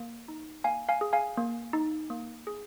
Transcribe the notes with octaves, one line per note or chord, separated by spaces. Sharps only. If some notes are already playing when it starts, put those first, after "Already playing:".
Already playing: A#3
D#4
A#3 F5 G#5
F5 G#5
G#4
F5 G#5
A#3
D#4
A#3
G#4